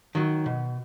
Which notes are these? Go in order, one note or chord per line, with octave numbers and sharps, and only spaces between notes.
D#3 F#3
B2